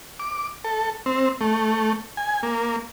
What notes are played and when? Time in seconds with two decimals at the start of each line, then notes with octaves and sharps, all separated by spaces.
0.20 D6
0.65 A4
1.06 C4
1.41 A3
2.17 G#5
2.43 A#3